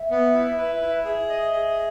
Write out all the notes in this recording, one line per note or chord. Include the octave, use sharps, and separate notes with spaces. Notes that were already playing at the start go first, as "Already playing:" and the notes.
Already playing: E5
B3
E4
B4
E4
G#4 E5
D#5
G#4